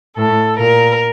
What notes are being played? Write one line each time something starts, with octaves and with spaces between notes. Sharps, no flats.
A2 A4
A#2 A#4